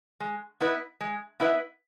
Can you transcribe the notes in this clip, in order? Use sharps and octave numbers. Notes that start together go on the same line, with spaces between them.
G#3
B3 E4 B4 D#5
G#3
B3 E4 B4 D#5